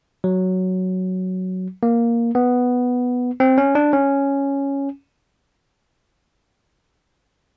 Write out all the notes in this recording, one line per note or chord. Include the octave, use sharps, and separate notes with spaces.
F#3
A#3
B3
C4
C#4
D4
C#4